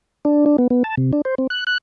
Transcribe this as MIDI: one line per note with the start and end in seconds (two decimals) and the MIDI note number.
0.25 0.45 62
0.46 0.57 62
0.58 0.67 59
0.70 0.83 59
0.84 0.95 81
0.97 1.11 48
1.13 1.21 62
1.25 1.35 72
1.38 1.47 60
1.50 1.64 90
1.67 1.78 90